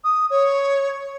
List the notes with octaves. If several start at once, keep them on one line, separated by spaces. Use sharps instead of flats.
D#6
C#5